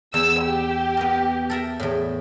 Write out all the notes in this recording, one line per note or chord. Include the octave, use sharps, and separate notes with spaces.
E2 E6
G4
B3 A#4
A4 A#4 E5
E2 A2